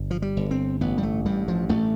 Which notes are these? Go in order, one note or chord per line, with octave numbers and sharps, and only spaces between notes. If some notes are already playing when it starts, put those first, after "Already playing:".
Already playing: G1
F3
G3
G1
C4
A1 B3
G3
A3
G2 G3
F3
A1 A3